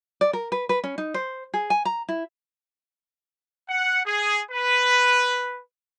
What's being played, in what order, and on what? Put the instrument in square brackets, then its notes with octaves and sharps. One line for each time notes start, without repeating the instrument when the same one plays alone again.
[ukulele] D5
A#4
B4
B4
C#4
D#4
C5
G#4
G#5
A#5
E4
[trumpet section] F#5
G#4
B4